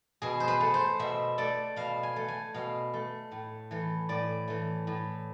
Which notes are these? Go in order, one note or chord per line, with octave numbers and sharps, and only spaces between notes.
B2 G#4
C5
B4
A3
C5
B2 E5
A3 D5
B2 F5
G#5
A3
G#5
B2 F5
A3
A2
E3 A3
A2 D5
E3 A3
A2